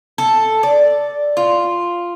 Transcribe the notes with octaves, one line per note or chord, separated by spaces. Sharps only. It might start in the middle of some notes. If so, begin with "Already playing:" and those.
A4
D5
F4